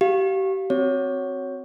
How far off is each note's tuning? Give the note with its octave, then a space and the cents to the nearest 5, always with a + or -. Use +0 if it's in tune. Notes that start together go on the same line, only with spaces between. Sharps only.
G4 -35 F5 +0
C4 +0 F#4 +0 C#5 +0